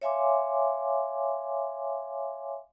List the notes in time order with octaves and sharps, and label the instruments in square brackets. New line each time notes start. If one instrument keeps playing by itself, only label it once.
[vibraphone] C#5 E5 F5 G#5 C6 D6